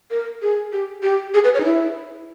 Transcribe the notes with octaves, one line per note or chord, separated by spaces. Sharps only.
A#4
G#4
G4
G4
G#4
B4
C#5
D#4
E4